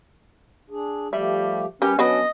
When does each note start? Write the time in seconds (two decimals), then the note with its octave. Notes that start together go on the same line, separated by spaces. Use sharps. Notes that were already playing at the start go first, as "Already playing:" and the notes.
0.70 D4 G#4
1.13 F3 G3 A3 G4 E5
1.82 G3 C#4 G4 A#4 B4
1.99 F#3 B3 C#4 D4 B4 D#5